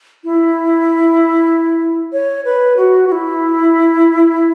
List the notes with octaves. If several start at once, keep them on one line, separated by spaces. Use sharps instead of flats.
E4
C#5
B4
F#4
F#4
E4